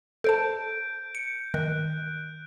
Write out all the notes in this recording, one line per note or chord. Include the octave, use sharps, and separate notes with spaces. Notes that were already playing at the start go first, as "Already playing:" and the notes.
A4 C5 A5 G6 D7
C#7
D#3 F#6